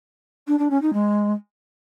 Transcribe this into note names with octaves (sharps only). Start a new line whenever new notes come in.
D4
D4
C#4
D#4
G#3